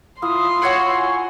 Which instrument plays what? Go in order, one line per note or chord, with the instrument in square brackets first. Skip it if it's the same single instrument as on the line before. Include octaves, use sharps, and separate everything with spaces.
[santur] E4 F4 E5 [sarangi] C6 [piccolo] D#6
[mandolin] F#4 C#5 F#5 [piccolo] E6
[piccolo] G#5